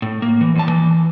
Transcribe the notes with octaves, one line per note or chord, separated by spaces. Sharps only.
A2
A#3
E3
E2 A5
E3